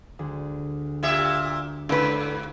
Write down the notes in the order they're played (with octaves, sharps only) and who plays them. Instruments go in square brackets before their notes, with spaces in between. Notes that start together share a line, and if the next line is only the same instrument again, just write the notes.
[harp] D2 G#3
[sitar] A#2 G4 E5
[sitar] G#2 [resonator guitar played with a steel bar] D3 B4 [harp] G4 C5 F#5